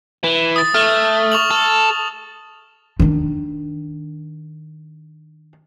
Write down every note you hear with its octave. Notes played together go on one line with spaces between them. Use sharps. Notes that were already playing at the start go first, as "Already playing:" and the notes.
E3
D#6 A6
A3 F6
C#6 F7 F#7
A4
D#3 D4